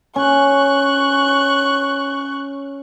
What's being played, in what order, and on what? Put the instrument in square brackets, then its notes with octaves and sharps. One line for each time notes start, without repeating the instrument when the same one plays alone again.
[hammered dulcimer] C#4 [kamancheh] C#6 F#6